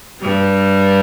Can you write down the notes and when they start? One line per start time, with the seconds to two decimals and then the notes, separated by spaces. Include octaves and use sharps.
0.22 G2 G3